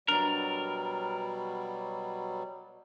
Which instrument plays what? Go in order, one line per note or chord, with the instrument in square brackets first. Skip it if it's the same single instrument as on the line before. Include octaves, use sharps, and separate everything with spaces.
[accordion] B2 F#3 G3 [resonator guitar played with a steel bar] D4 A#5 [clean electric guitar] A#4